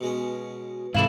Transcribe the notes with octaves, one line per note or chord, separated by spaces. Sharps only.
B2 G#3 C#4
G#2 C3 E3 E4 A4 F5